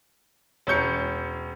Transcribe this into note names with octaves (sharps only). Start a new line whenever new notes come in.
E1 C#4 G6 C#7